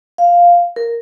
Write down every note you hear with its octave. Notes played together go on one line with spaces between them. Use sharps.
F5
A#4